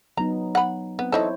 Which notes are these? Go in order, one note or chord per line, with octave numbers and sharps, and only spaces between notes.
F#3 B3 D#4 A#5
F#5 B5
B3 C4
E3 D#4 E4 A4 C5 C#5